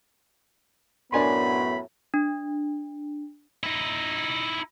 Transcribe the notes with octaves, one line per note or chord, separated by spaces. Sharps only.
F#2 A2 B3 D4 G#5 B5 C6
D4
D#4 E4